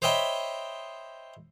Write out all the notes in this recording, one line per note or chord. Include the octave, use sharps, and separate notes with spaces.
C5 C#5 D#5 E5 G5 B5